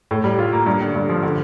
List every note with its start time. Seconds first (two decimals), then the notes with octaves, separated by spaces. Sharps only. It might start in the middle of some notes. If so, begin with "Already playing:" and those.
0.11 A2
0.24 G3
0.39 F4
0.53 A#3
0.66 G2
0.82 D3
0.96 G2
1.09 F3
1.23 D3